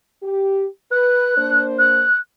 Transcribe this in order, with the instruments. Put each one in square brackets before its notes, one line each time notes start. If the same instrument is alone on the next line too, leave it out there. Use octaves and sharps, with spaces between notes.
[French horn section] G4
[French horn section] B4 [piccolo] F#6
[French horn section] A#3 D4 C5
[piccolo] F#6